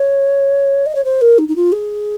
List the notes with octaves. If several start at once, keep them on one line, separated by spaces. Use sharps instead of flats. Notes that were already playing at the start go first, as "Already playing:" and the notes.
Already playing: C#5
D#5
C#5
C5
A#4
D#4
D#4
F4
G#4